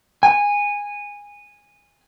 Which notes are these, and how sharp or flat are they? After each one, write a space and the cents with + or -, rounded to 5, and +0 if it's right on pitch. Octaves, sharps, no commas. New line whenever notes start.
G#5 -15